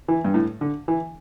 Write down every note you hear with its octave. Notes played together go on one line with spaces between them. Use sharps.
E3
G2
A2
D3
E3